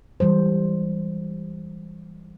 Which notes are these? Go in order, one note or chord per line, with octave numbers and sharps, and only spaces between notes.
E3 G3 G#3 C5